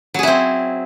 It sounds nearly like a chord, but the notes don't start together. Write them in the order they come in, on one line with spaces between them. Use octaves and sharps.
F#3 G#4 E4 C4